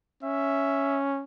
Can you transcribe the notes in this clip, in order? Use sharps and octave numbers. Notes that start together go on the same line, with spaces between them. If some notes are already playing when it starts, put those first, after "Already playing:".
C#4 E5